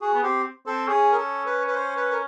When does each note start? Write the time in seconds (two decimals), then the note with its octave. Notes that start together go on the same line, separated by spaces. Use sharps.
0.01 F#4 G#4
0.14 B3
0.23 C4 G4
0.66 C4 A4
0.88 C#4 G#4
1.12 A#4
1.17 A4
1.46 B4
1.67 B4
1.75 C5
1.96 B4
2.11 A#4